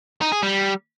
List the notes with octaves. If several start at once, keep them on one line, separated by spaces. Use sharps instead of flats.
D#4
G#4
G3